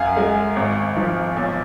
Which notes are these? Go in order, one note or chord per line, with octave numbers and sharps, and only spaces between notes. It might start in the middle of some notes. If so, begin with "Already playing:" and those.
Already playing: F#2 F5 F#5 G#5
G#3
G#1
F3
B1